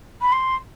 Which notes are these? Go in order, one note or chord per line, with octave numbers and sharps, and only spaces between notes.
B5
C6